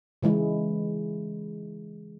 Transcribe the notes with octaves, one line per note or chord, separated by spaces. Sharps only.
C#3 E3 G#3 E4